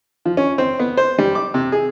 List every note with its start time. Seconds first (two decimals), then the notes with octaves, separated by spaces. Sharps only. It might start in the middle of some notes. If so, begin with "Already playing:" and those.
0.25 F3
0.37 C#4
0.58 C4
0.79 B3
0.97 C5
1.18 G3
1.35 D6
1.54 C3
1.72 G#4